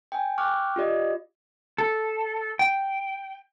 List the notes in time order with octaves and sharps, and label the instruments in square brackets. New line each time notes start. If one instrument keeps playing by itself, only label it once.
[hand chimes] G5 G#5
G5 C#6 D6 F6 F#6
F4 G4 D5 D#5
[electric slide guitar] A4
G5